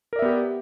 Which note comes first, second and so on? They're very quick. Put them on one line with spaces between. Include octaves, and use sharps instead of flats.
A#4 D5 E5 B3 G4